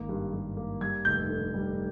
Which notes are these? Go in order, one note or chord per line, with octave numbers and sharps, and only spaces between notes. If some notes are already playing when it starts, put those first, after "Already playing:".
Already playing: G#1 A#3
G2
G2
A#3
G3 G#6
F1 G6
D3
G3